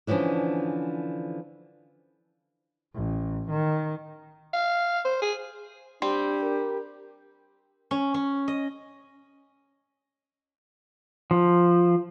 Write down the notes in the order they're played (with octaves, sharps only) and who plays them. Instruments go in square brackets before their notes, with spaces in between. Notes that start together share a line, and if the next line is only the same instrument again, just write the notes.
[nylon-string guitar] D3 E3 F3 C#4 D4
[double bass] A1
D#3
[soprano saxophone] F5
C5
G#4
[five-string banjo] G3 C4 [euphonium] D4 [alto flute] G4
[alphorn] A#4
[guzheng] C#4
C#4
D#5
[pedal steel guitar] F3